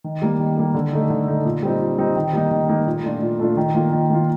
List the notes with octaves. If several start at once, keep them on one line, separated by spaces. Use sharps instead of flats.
D#3
G3 A#3
D#3
G3 A#3
D3
A3 D#4
D3
A3 D#4
A#2
G3 C4 D#4
A#2
G3 C4 D#4
D#3
G3 A#3 D#4
D#3
G3 A#3 D#4
A#2
A3 D4 F4
A#2
A3 D4 F4
D#3
A#3 F4
D#3
A#3 F4